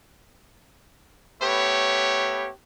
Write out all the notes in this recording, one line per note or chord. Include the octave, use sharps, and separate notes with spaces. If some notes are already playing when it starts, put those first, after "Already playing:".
A3 B3 G4 B4 C#5